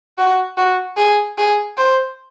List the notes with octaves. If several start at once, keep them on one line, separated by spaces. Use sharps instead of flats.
F#4
F#4
G#4
G#4
C5